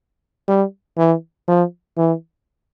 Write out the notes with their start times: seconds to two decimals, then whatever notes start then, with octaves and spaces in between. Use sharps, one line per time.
0.48 G3
0.98 E3
1.48 F3
1.97 E3